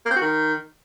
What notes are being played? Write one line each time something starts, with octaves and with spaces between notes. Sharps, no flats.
A#3
C4
F#4
D#3